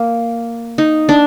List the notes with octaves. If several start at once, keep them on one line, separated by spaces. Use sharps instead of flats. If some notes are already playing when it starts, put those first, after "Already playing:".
Already playing: A#3
D#4
D4